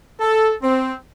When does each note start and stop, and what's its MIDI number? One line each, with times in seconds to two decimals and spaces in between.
0.20 0.53 69
0.62 0.93 60